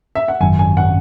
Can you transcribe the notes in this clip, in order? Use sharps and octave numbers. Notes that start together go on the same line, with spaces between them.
E5
F#5
G#1 F#2 D#3 F#3 G#5
G#5
F#5